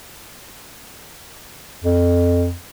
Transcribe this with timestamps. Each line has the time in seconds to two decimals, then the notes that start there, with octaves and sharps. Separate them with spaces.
1.83 F2